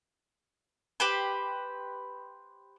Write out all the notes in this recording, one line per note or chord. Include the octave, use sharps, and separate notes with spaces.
G4 B4 C5